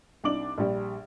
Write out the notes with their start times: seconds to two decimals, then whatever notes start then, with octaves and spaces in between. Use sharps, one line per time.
0.24 C2 D4 D#4 D6 F#7
0.58 A#1 G3